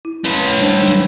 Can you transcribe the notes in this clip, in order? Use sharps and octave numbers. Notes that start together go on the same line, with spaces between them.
E4
C#4 B4
G3 D4 C5
F#3 D4 D#4